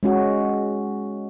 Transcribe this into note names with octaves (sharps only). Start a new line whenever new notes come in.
G#3 C#4 F#4